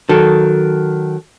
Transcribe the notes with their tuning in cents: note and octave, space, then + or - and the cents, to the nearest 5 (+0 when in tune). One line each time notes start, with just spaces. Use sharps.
D#3 +0 F#3 +0 A4 +0